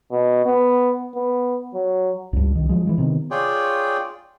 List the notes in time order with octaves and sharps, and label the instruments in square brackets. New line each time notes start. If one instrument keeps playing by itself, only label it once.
[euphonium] B2
B3
B3
F#3
[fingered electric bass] C#2 G2
C2 D#3
F3 F#3 G#3
E3 F3 G#3
C3 D#3 B3
[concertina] F4 G#4 C#5 D5 G5